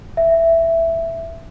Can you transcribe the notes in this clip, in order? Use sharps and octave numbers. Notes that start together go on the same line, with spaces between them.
E5